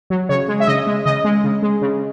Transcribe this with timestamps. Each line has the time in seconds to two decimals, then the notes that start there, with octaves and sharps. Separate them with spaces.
0.10 F#3
0.29 C#3 C#5
0.48 G#3
0.60 E5
0.67 C#3 D#5
0.87 G#3
1.06 C#3 D#5
1.24 G#3
1.44 C#3
1.63 G#3
1.82 C#3